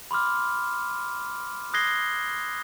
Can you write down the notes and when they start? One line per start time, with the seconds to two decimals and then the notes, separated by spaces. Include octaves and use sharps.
0.11 B5 C6 D6 F6
1.74 D#6 F#6 G#6 A#6 C7 G7